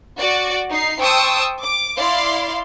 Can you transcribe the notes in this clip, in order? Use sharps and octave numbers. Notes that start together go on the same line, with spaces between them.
F#4 D5
D#4 C7
C5 G5 A5 C#6 D#6 E6
D6
E4 D5 F5 C6